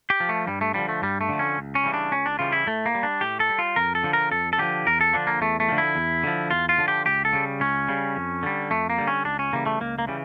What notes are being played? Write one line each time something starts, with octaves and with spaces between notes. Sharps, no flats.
G4
F3
A3
G2 G3
A3
D3 F3 G3
A3
G2 G3
A3
D3 F3
C#4
C#2
C#4
C#3 E3 G3
D4
C#2 C#4
D4
C#3 E3 G3 F4
E4
A2 A3
A#3
G3
D4
A2 G4
A4
G3
F4
F2 A#4
A4
D3 F3
A#4
F2 A4
A4
D3 F3 G4
E2 A#4
A4
D3 F3 D4
A#3
E2 A3
A3
D3 F3
E4
E2
D3 F3
E2 F4
F4
D3 F3
G4
C#2 G4
A4
C#3 G3
C#2 C#4
C#3 G3
F2
D3 G3
F2 A3
A#3
D3 G3
C#4
C#2 D4
C#4
C#3 E3 G3 A#3
A3
C#2 A#3
A#3
C#3 E3 G3